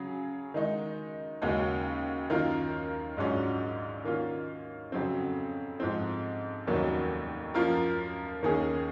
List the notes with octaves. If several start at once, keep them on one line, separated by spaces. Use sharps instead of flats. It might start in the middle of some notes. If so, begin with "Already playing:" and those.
Already playing: C#3 F#3 C#4 G#4
D#3 G#3 D#4
D#2 C#3 G#3 C#4 F#4
F#2 D#3 A#3 F4 A#4
A#1 G#2 F#3 C#4 F4
D#3 A#3 C#4 F4
F2 C#3 F#3 C4
G#2 F3 C4
F1 D#2 D#3 F#3 C#4
F#2 F3 A#3 F4 A#4
D#2 D#3 A#3 C#4 G#4